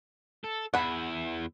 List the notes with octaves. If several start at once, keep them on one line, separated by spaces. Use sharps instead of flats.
A4
E2 E4 F#5 B5